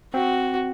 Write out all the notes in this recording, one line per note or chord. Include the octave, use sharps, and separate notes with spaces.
C4 F#4